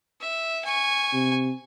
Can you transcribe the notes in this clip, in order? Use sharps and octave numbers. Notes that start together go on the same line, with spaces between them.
E5
G#5 C#6
C3